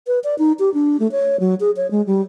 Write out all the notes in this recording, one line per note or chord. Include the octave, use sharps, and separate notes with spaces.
B4
D5
D#4
G4
D4
A3
C#5
F#3
G#4
C#5
G#3
G3